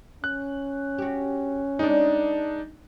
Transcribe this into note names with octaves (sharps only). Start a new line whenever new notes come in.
C#4 F#6
F#4 G4
G#3 D4 D#4 D5